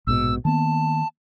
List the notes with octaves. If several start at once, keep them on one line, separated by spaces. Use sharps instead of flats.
A#1 G#2 B2 E6
D#3 A#3 B3 A5